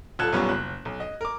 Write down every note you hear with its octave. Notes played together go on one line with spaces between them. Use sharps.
D#1 F4 A4 F#6 G#6 E7
B1 F#2 G3 B3 F4 C#5
F#1 F#6
B1
D#5
A#4 D6